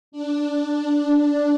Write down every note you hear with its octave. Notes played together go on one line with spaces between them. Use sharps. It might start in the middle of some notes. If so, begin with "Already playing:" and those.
D4